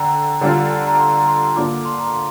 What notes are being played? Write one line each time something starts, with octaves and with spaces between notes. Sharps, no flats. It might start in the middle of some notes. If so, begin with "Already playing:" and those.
Already playing: D3 G5 A#5
D3 G3 D4 F4
A#5
C6
A#5
C6
D3 A#3 D4 F4 D6
D6
C6
A#5
C6